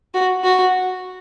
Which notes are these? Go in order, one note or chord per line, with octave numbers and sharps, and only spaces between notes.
F#4
F#4